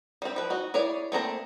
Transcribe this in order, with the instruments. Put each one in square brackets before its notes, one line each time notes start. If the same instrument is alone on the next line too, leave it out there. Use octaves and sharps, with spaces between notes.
[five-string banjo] G3 C4
F3 B4
D#4 F#4
E4 G#4 C#5 D5
A3 A#3 C4 A#5